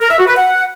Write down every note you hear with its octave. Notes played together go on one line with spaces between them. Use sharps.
A#4
E5
F#4
B4
F#5